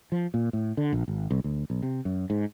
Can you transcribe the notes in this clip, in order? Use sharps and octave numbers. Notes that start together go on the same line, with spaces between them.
F3
A#2
A2
D3
A#1
G#1
C2
D2
B1
C3
F#2
G#2